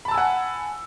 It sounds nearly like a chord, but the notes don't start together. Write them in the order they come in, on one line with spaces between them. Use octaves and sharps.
B5 A5 E6 G#5 F#5